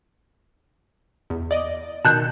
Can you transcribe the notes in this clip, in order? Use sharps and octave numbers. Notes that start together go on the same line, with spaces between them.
E2
D5 D#5
B2 D#3 A5 F#6 G6